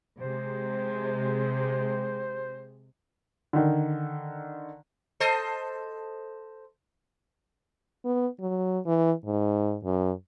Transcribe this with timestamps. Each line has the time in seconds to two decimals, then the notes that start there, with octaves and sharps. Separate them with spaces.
0.20 C3 G#3 C5
3.53 D3 D#3
5.20 A4 C5 D#5
8.05 B3
8.40 F#3
8.86 E3
9.26 G#2
9.84 F#2